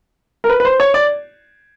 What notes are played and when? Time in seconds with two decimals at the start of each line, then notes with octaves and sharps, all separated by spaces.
0.44 A#4
0.50 B4
0.60 B4
0.65 C5
0.80 C#5
0.94 D5